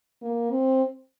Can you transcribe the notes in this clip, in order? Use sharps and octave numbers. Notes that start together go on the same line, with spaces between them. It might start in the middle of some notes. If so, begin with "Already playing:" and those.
A#3
C4